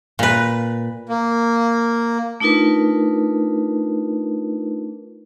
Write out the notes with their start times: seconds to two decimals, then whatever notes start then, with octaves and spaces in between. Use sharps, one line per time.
0.19 A#2 B4
1.09 A#3
2.40 A3 D4 D#4 F4 A#4 B4